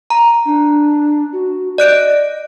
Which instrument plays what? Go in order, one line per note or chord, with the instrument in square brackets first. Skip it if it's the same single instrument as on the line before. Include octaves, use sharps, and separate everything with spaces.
[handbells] A#5
[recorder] D4
F#4
[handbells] D5 F#6 D7 [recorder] D#5